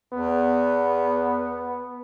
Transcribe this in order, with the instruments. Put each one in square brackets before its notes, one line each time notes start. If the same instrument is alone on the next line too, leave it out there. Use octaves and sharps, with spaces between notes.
[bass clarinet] E2 [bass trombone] B3